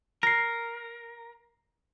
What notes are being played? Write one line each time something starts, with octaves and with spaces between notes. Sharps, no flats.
A#4 A#6 C7